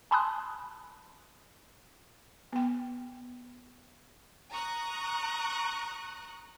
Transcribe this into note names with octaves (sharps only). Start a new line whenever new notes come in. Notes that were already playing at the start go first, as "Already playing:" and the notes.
G#5 A5 B5 C6 D#6 F#6
B3 G5
A#5 C#6 D#6 F#6